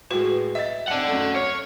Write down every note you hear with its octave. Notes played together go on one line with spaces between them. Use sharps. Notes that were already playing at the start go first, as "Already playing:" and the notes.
A2 G#3 F#4 B4
D#5 E5 A6
C4 D5 F#5 A5 F#7
F#2 A3
C#5 F6